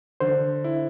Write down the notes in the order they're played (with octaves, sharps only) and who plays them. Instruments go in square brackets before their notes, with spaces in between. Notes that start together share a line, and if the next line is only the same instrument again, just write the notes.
[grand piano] D3 [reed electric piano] C5
[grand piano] E4